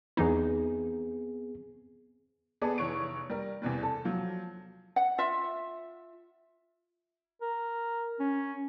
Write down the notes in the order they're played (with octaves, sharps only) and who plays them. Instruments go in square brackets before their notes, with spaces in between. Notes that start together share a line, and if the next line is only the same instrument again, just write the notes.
[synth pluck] E2 E3 D#4 [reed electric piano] B3 C4 G#4
[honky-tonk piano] B3 G#4 A4 B4 D5
F1 E3 C#5 C#6 D7
G3 A#4
E2 C3 E3 G3
A4
F3 F#3
[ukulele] F#5
F4 E5
[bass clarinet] A#4
C#4